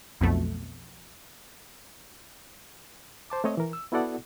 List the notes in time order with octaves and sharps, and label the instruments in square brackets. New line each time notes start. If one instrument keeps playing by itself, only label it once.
[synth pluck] B1 F2 B2 A3
[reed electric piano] C5 A5 D6
A3 C4 C#5 D#5
E3 A#4
E6
B3 E4 F#4 A4 D5 F#5